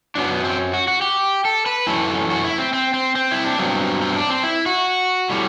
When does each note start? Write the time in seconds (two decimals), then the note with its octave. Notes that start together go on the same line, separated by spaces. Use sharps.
0.15 F#2 F#3 B3 D4
0.30 B3
0.44 C4
0.74 F#4
0.88 F#4
1.02 G4
1.45 A4
1.66 B4
1.87 F#2 E3 A3 A4
2.30 F#4
2.44 E4
2.58 C4
2.73 C4
2.94 C4
3.16 C4
3.32 E4
3.45 D4
3.59 G2 F#3 B3 C4
4.01 C4
4.16 D4
4.29 C4
4.43 E4
4.66 F#4
5.30 A2 G3